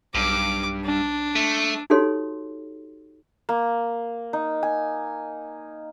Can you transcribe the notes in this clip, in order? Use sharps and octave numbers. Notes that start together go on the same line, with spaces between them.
B1 G2 D6
D4
A3
D#4 F#4 G4 A4 C#5 C6
A#3
D#4
G#5